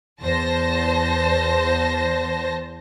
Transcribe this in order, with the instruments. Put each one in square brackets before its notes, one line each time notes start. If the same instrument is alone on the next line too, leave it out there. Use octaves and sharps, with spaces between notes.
[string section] E2 C5 A5 A#6